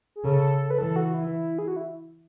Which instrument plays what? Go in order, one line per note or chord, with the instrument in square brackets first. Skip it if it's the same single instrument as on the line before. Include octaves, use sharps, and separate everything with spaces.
[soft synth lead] G#4
[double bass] C#3 [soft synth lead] A4
[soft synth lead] B4
[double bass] E3 [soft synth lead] A4
[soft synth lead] F#4
E4
G#4
F#4
E4